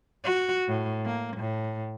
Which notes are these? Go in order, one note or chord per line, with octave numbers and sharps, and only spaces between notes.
F#4
A2
A#3
A2